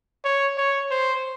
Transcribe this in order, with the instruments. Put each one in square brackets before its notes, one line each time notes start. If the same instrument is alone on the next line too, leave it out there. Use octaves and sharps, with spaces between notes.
[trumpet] C#5
C#5
C5